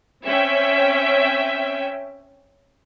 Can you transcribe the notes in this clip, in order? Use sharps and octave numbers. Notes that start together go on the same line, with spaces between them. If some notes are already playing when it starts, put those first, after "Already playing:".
C4 C#4 E5 G5